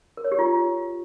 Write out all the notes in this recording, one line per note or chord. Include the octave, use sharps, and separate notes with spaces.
A#4
C#5
G4
F4